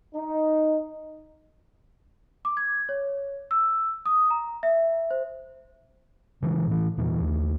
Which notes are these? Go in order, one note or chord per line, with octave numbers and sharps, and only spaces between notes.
D#4
D6
G#6
C#5
E6
D#6
A#5
E5
C5
C#3 E3 G#3
A2 E3
E2 A#2 E3
D#2 A3